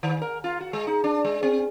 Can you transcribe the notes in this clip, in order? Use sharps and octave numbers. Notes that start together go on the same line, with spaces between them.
D#3
A#4
F4
F#4
G#3
D#4
D4
G#3
C4